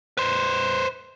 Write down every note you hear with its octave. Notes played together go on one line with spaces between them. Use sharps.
B4 C5